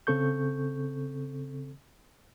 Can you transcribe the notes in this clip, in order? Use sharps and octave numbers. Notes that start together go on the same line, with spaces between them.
C#3 C4 A4 C#6 G6